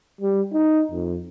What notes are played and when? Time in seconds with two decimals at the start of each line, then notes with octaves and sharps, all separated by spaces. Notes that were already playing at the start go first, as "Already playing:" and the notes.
0.21 G3
0.53 D#4
0.91 F2